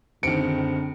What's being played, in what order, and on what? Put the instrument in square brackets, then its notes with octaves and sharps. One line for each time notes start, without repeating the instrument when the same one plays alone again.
[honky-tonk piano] F#1 D#3 [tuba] D3 [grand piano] C4 C#7 D7